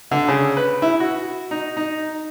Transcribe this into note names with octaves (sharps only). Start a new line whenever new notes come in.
D3
C#3
B4
E4
F#4
D#4
D#4